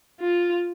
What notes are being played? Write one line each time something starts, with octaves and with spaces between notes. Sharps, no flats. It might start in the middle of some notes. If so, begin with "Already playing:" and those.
F4